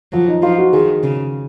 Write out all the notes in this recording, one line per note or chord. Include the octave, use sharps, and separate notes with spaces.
F3 F#3
D#4
F3 F4
F#4
D#3 G#4
C#3